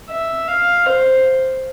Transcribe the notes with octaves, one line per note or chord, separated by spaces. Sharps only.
E5
F5
C5